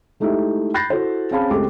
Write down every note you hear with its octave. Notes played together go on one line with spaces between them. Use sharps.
G#3 A3 D#4 E4 G4 E5
B5 F#6 G6 A6 A#6 C7
E4 F#4 A4 C5
C4 C#4 G#4 F5 A5 B5
C#2 G#3 A3 C4 G4 D6